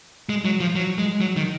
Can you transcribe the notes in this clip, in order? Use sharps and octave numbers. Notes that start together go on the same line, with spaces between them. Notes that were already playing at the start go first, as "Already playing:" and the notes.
G#3
F#3
F3
F#3
G#3
F#3
D#3